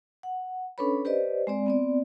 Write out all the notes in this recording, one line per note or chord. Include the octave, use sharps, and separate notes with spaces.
F#5
C#4 D4 A4 B4 C#5 B5
G4 B4 C5 D5 D#5
G#3 C4 D5
B3 C4 D5